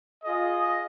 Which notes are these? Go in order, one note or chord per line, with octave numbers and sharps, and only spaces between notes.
F4 G#4 D#5